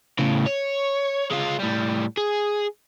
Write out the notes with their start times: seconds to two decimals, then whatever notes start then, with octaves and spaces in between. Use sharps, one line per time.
0.19 A2 C#3
0.46 C#5
1.31 G#3 F4
1.59 A2 G3
2.17 G#4